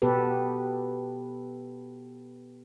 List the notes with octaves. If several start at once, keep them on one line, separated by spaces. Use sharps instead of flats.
B2 B3 G4 A4 B4